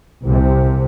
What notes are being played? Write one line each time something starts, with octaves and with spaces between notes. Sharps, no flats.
C2 C3